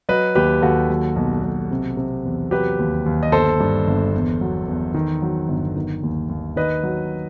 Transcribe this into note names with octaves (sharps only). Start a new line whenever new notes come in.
F#3 B4 D#5
D#2 G4 B4
D#2 F#4 A4
F#3
B1
B1
C3
C3
E2
F#3 G4 B4
D#2
D#2
D#5
G1 A4 C5
G2
G1
E2
F#3
E2
D#3
F#3
G1
D#3
D#2
D#2
D#3 B4 D#5
F#3